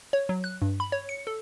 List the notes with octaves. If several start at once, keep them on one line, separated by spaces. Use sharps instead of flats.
C#5
F#3
F#6
G2
B5
C#5
C#7
A4